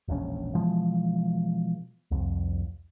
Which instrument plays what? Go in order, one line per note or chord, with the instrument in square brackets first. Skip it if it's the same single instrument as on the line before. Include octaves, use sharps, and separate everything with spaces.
[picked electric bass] E1 A#1 C#4
B2 E3 F3 G#3
C2 F2